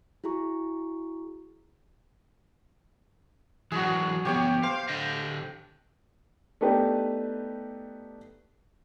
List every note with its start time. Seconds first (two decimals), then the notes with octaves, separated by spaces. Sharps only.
0.24 E4 F#4 G#4 A#5 C#6
3.72 E3 F#3 D4 F#4 G#4
4.25 D3 F3 B3 G4 C#5 G5
4.63 C5 F5
4.88 D3 D#5 F5
6.61 A3 B3 D4 D#4 G4 B4